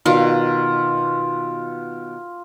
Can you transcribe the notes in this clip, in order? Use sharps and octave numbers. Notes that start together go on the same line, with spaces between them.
B2 D#3 F4 F5